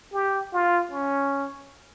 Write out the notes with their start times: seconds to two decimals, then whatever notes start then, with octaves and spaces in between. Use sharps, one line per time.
0.13 G4
0.53 F4
0.91 C#4